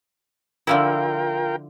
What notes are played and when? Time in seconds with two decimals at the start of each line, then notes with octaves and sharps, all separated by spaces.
0.67 D3 F3 E4 F4 A#4 G5